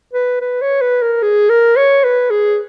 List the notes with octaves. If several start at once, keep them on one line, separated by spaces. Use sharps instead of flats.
B4
B4
C#5
B4
A#4
G#4
A#4
C#5
B4
G#4